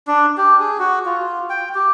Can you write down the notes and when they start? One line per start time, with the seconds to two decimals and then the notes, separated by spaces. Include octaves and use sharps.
0.07 D4
0.37 G4
0.60 G#4
0.79 F#4
1.05 F4
1.50 G5
1.75 G4